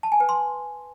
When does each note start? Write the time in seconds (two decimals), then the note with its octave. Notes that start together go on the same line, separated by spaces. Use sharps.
0.03 A5
0.12 G#5
0.20 B4
0.29 C6